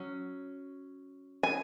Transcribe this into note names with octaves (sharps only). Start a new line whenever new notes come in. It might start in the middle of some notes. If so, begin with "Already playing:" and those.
Already playing: F#3 C#4
G#5